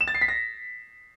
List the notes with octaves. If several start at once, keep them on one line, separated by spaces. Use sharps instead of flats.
E7
A6
C7
B6
A#6